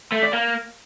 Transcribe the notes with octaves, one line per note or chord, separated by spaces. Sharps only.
A3
D5
A#3